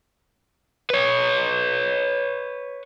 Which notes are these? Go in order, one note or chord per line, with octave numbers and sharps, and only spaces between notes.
B4 C#5